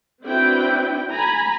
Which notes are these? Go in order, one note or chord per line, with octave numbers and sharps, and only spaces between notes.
C4 D4 E4 F#4 B4 G5
G#5 A#5 B5